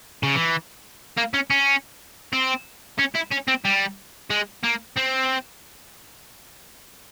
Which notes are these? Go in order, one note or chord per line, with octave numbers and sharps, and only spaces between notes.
C#3
E3
A#3
C#4
C#4
C4
C#4
E4
C#4
C4
G3
G#3
A#3
C4